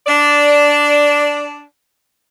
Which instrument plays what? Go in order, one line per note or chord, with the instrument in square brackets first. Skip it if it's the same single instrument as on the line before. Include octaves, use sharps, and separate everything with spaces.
[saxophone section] D4 D5